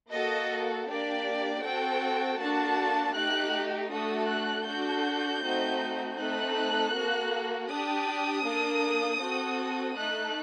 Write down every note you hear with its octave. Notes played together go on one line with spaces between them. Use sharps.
A#3 F#4 A4 D#5
A#3 D4 G4 D5
C4 F#4 A4 G5
A#3 D4 F#4 A4 A5
A3 D#4 G4 F#6
A3 D4 F#4 A4 D#6
F#6
D4 F#4 A4 G6
A3 C4 D#4 F#4
A3 C4 D#4 A4 F#6
A#3 F#4 A4
D4 G4 D#6
A#3 D4 A4
C4 F#4 A4
A3 D#4 A4 F#6